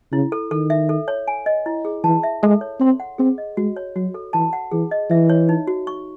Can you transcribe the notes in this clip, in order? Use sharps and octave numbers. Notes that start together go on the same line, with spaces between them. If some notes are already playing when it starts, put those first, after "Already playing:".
C#3 E4
A4
D#3 A4
E5
A4
C#5
G#5
D#5
E4
G#4
E3 A5
E5
G#3 A4
C#5
C4 C6
F#5
C4 G#4
D#5
G#3 F#4
C#5
F#3 F#4
A4
E3 A5
F#5
E3 G#4
D#5
E3 E5
C#5
D#4
F#4
C#6